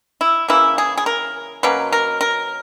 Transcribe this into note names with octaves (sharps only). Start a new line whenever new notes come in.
E4
C#3 E3 A#3 E4
G#4
G#4
A#4
B2 F#3 A#3 C#4 B4
A#4
A#4